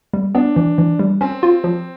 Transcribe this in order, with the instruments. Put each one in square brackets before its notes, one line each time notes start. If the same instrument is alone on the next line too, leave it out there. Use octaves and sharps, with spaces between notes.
[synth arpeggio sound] G3
[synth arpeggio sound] B3 [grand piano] D4
[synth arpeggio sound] E3
E3
G3
[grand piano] C4 [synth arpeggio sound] C#4
[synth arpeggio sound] F4
F3